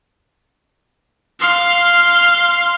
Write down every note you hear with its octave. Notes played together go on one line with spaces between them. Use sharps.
F5 C6